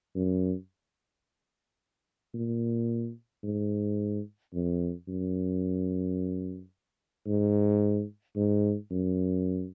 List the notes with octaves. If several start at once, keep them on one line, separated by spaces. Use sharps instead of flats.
F#2
A#2
G#2
F2
F#2
G#2
G#2
F#2